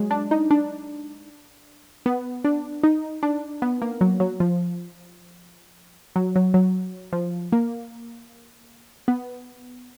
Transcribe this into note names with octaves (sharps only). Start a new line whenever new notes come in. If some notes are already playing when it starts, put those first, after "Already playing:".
Already playing: F#3 G#3
D4
D#4
D4
B3
D4
D#4
D4
B3
A#3
F#3
F#3
F3
F#3
F#3
F#3
F3
A#3
B3